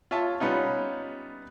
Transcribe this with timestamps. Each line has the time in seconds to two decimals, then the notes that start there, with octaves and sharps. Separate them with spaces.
0.11 F4 C#5 E5 A5
0.40 G3 B3 C#4 D#4 F4